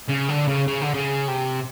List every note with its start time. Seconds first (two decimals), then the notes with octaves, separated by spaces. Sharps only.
0.08 C#3
0.28 D3
0.48 C#3
0.68 C#3
0.81 D3
0.94 C#3
1.28 C3